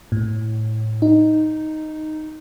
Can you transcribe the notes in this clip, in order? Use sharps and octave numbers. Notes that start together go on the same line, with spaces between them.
A2
D#4